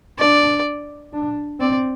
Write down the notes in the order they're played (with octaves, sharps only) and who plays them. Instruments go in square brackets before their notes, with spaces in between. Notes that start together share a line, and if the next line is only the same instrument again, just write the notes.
[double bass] D4 [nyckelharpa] D5
[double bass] D4
[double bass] C4 [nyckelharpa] D5